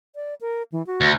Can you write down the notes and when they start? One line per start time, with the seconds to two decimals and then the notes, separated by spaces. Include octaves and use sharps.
0.15 D5
0.41 A#4
0.72 E3
0.87 F#4
1.01 D2